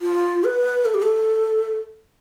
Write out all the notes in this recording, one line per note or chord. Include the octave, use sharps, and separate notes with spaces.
F4
B4
A4
G4
A4